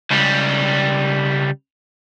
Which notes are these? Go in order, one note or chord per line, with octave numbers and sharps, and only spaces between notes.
C#2 G3